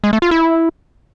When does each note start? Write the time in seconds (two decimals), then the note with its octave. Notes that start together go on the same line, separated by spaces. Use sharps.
0.04 G#3
0.13 A3
0.22 F4
0.31 E4